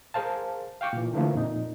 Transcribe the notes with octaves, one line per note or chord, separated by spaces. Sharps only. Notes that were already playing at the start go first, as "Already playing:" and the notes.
G#4 A#4 C5 F5 A5
F5 G5 C#6 D6
A#2 E3
D3 E3 F3 A3 A#3
F2 A#2 D#4